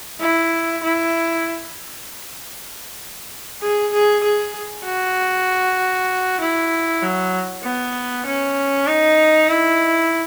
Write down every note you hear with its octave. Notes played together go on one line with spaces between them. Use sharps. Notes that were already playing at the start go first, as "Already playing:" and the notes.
E4
E4
G#4
G#4
G#4
F#4
E4
F#3
B3
C#4
D#4
E4